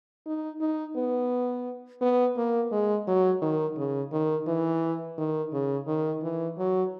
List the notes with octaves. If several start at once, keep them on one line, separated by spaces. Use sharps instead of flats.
D#4
D#4
B3
B3
A#3
G#3
F#3
D#3
C#3
D#3
E3
D#3
C#3
D#3
E3
F#3